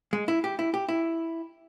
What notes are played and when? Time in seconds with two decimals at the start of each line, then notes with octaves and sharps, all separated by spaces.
0.13 G#3
0.28 E4
0.44 G4
0.59 E4
0.74 G4
0.89 E4